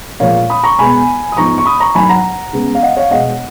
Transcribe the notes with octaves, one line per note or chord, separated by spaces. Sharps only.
A#2 F3 G#3 C#5 F5
B5 D#6
A#5 C#6
B2 G#3 B3 G#5 B5
D#6
G#2 F3 B3 A#5 C#6
C#6
B5 D#6
A#5 C#6
G#2 D#3 F#3 G#5 B5
F#5 A#5
C#3 G#3 B3
F5
D#5 F#5
C#5 F5
B2 G#3 B3 D#5 F#5